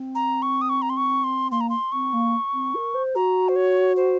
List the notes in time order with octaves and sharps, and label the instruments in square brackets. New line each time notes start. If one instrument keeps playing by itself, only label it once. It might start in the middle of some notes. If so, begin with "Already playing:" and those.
Already playing: [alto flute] C4
[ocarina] A#5
C#6
D#6
C#6
A#5
C6
C#6
C6
[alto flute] A#3 [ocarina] C6
[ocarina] A#5
C6
[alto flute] C4 [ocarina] C#6
[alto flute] A#3
C4
A#4
C5
[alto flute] F#4 [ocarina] A#5
[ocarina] C5
C#5
C5